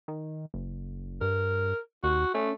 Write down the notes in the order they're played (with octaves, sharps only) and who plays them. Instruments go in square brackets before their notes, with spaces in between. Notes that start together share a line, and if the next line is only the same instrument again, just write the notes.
[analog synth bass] D#3
F#1
[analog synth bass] G2 [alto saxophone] A#4
[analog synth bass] D#2 [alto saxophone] F#4
[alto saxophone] A3 [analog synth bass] C#4